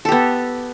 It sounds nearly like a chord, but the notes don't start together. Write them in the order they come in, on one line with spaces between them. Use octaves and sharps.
A4 G4 B3